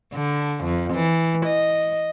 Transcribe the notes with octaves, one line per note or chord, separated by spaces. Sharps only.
D3
F2
E3
D#5